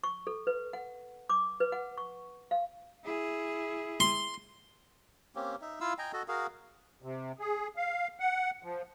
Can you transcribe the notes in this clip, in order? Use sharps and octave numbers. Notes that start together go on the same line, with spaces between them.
C#6
A4
B4
F#5
D6
B4
F#5
C#6
F5
E4 G#4
C6
A#3 C4 C#4 G4
D#4 E5
E4 F4 F5 E6
D#5 G5 G#5 A#5
F#4 A4 D#5
F#4 G#4 A#4 F5
C3
G#4
F5
F#5
F3